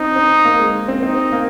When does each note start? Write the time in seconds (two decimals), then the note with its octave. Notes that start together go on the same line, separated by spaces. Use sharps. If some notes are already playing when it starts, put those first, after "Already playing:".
Already playing: C4 D#4
0.16 C4
0.45 A#3
0.60 G#3
0.88 C4
1.03 C4 D#4
1.32 A#3